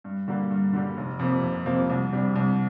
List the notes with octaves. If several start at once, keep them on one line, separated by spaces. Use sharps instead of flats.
G2
D3 G3 A#3
G2
D3 G3 A#3
F1
F2 C3 F3 A#3
F1
F2 C3 F3 A#3
C2
C3 G3 D4
C2